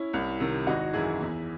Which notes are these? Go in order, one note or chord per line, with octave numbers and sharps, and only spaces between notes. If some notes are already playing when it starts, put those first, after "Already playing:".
Already playing: C#4 E4
C2
C3 D#3
G#1 D#4 F#4
F#2 E3 E4 G#4
E2